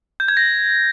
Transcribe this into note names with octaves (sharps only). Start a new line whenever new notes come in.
G6
G#6
A#6